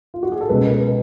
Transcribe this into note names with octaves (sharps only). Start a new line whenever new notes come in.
F4
F#4
G#4
A4
C#2 B2 G#3 B4
B4